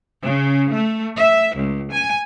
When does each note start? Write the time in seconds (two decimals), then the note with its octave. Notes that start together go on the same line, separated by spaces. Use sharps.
0.23 C#3
0.72 A3
1.17 E5
1.57 C#2
1.91 G#5